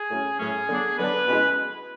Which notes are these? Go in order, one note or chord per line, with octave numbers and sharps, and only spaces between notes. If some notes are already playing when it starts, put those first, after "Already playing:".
Already playing: G#4
A2 F#3 A3 C#4
A2 F#3 A3 C#4 G#4
D3 F#3 B3 D4
D3 F#3 B3 D4 B4
B2 G#3 C#4 E4